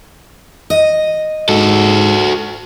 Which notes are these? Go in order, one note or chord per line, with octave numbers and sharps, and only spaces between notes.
D#5
G#2 F#4 A4